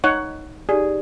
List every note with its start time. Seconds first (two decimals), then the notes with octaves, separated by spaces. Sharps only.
0.04 D#4 C#5 F#5
0.69 D#4 G4 G#4 D5